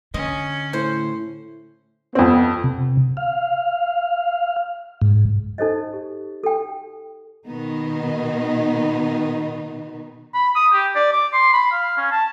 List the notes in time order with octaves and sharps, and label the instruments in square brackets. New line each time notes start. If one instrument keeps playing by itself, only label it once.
[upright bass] D3 [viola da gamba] C#4 [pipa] D#5
[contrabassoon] A2 [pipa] C5
[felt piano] F2 C4 [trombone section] B3
[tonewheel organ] C3
F5
G#2
[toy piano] D#4 A4 C5 D#5
G4
A4 G5
[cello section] B2 D#3 B3 D#4
[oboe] B5
D#6
G4
D5
D6
C6
B5
F5
C#4
A5